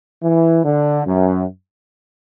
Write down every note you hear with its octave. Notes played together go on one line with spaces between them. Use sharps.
E3
D3
F#2